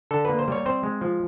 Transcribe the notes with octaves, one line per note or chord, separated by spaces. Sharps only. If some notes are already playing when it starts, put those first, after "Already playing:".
D3 A4
A#3 B4
C5
G3 C#5
C4 C5
G#3
F3